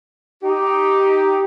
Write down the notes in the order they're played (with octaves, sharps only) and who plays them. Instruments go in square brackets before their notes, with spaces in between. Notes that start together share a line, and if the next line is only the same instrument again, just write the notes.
[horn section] D#4 G4